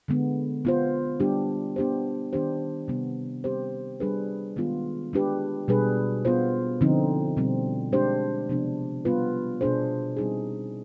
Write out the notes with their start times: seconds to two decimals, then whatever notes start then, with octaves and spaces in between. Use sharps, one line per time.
0.08 D3 G#3 B3
0.65 B3 F4 C5
1.20 G3 B3 D4 G4
1.76 B3 D4 G4 C5
2.33 D#3 B3 D4 G4 C5
2.88 C3 G3 B3
3.44 G3 C4 G4 C5
4.00 G3 D4 G#4 B4
4.56 D#3 G#3 B3 F4
5.13 G#3 D4 G4 B4
5.68 B2 G3 D4 G#4 B4
6.25 B3 F4 C5
6.81 D3 F3 C4 D#4
7.37 B2 G3 C4
7.93 G#3 D4 G4 C5
8.49 C3 F3 B3 D4
9.05 G3 B3 F4 B4
9.61 B2 B3 D4 G#4 C5
10.17 G3 C4 D#4 G#4